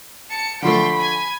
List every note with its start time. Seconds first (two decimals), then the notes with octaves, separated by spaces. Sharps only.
0.30 A5 C#7
0.62 D3 F3 A3 G5 B5 C6
0.97 G#5